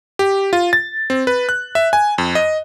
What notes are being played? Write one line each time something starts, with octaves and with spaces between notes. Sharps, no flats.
G4
F4
A6
C4
B4
F#6
E5
G#5
F2
D#5